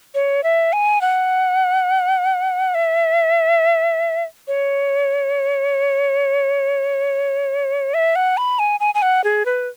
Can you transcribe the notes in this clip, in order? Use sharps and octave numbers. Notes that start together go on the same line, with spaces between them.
C#5
E5
G#5
F#5
E5
C#5
E5
F#5
B5
G#5
G#5
G#5
F#5
G#4
B4